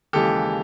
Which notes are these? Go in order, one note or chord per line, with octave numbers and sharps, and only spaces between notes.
D#2 C#3 E3 G#3 G4 A4